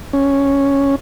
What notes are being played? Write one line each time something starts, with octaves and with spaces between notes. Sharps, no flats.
C#4